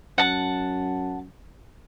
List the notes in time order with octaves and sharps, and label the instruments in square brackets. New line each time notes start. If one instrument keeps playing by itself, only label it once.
[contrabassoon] F#2 [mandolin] F#5 A5